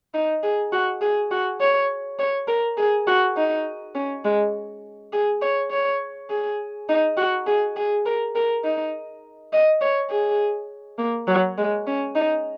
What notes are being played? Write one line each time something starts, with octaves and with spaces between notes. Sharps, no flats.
D#4
G#4
F#4
G#4
F#4
C#5
C#5
A#4
G#4
F#4
D#4
C#4
G#3
G#4
C#5
C#5
G#4
D#4
F#4
G#4
G#4
A#4
A#4
D#4
D#5
C#5
G#4
A#3
F#3
G#3
C#4
D#4